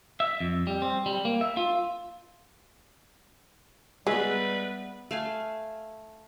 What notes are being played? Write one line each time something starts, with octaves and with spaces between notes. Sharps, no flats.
E5
F2
G3
C4
G3
A#3
E5
F4
G3 G#3 B3 B4 E5
A3 F5 G#5